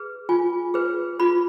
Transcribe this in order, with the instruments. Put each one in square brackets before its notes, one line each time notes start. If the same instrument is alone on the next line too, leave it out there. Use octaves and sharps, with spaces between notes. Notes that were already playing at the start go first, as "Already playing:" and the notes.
Already playing: [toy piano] G#4 B4
F4 G#5
G#4 B4
F4 B5